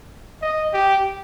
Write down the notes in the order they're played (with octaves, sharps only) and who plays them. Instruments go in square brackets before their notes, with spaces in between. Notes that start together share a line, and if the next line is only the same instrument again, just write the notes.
[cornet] D#5
G4